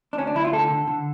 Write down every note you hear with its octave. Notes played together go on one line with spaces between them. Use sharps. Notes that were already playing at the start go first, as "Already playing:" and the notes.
D4
D2 C#4
D4
D2 E4
F4
D3 A4
D3
D3